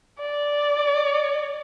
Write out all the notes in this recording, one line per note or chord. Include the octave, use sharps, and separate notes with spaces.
D5